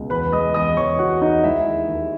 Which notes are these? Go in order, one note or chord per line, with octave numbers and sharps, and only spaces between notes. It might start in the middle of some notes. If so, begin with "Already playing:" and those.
Already playing: C#2 B2
E2 B4 B5
G#3 D#5 D#6
E2 D#5 D#6
E2 C#5 C#6
E2 F#4 F#5
E2 D#4 D#5
G#3 E4 E5
D#2
D#2